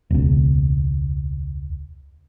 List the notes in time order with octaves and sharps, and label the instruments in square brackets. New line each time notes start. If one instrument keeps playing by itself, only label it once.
[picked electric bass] E1 C#2